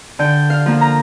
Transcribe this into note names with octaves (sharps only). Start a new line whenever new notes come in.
D3 G5
F5
F3 A#3
A#5